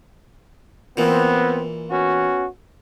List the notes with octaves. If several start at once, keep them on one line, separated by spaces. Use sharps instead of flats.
A#2 E3 B3 C4
B3 C#4 F#4